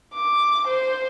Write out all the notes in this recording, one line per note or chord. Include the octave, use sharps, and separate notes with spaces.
D6
C5